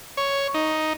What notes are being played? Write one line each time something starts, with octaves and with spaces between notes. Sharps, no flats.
C#5
D#4